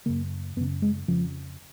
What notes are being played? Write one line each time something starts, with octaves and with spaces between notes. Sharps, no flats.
F#2 C#3 A#3
F#2 C#3 B3
G#3
F2 C#3 F3